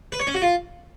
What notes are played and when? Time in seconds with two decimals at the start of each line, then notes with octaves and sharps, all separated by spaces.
0.12 B4
0.20 C#5
0.27 C#4
0.34 F#4
0.42 F4